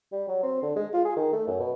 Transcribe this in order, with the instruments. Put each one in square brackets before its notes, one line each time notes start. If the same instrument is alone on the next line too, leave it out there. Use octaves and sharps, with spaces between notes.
[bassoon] G3
F#3
C4
D3
G#3
F4
G#4
D#3
A3
F#2
B2